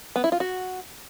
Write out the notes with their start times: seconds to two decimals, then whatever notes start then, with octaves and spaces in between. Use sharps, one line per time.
0.16 B3
0.24 E4
0.32 F4
0.40 F#4